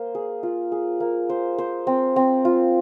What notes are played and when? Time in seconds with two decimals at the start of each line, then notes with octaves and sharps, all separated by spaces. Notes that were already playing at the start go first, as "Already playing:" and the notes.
Already playing: A#3 C5
0.15 G#4
0.43 F4
0.72 G#4
1.00 A#3
1.30 C5
1.58 C5
1.87 C4
2.16 C4
2.45 F4